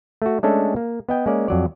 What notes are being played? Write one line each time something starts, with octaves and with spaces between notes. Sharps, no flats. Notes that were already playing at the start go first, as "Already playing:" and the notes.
A3 F#4
G#3 A3 C#4 D4 A4
A#3
B3 D#5 G5
G#3 A#3 C#4 D5
F2 F#3 D5